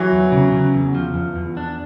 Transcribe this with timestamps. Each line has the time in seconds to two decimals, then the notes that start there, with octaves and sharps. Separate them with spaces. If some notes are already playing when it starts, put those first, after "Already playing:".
Already playing: E3 F#3
0.11 E2
0.32 C#3
0.52 C#3
0.74 E2
0.95 F3
1.14 E2
1.36 E2
1.57 D4